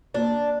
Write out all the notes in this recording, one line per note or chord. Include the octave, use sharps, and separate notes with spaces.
A#3 D4